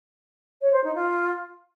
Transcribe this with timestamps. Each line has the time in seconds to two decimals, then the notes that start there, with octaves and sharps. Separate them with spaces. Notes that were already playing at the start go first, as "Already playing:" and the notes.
0.61 C#5
0.72 C5
0.83 D#4
0.95 F4